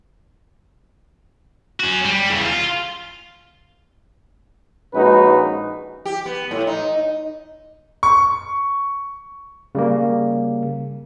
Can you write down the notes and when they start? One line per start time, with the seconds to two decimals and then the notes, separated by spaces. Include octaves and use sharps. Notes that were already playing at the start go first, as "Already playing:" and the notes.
1.80 C#4 F#4
2.05 G3
2.30 E2 C#3
2.46 F4
4.94 A#1 G#3 C#4 D#4 F#4 B4
6.05 G4
6.26 B3
6.51 A2
6.67 D#4
8.03 C#6
9.75 C#3 G3 A#3